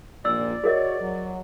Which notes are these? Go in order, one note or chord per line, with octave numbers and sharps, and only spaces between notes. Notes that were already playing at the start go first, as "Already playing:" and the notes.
A#1 D#2 A#2 D5 E6
F#4 G#4 A#4 C#5 D#5
F#3